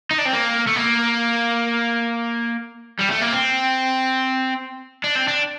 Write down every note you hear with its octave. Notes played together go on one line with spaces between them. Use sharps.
D#4
D4
C4
A#3
A3
A#3
G3
A3
A#3
C4
D4
C4
D4